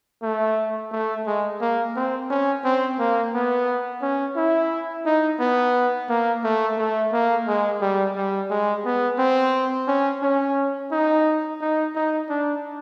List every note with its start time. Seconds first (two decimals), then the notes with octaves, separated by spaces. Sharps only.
0.23 A3
0.92 A3
1.27 G#3
1.61 A#3
1.96 C4
2.30 C#4
2.64 C4
2.99 A#3
3.34 B3
4.02 C#4
4.36 E4
5.06 D#4
5.40 B3
6.09 A#3
6.44 A3
6.78 A3
7.12 A#3
7.47 G#3
7.81 G3
8.16 G3
8.50 G#3
8.85 B3
9.19 C4
9.87 C#4
10.22 C#4
10.92 D#4
11.61 D#4
11.95 D#4
12.30 D4